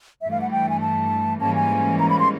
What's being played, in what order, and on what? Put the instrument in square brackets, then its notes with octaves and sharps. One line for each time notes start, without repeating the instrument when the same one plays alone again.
[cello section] G2 E3 A3 [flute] E5
[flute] F5
F#5
G5
G#5
A5
[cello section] G#2 E3 G3 A#3 C#4 [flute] A5
[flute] G#5
A#5
B5
C6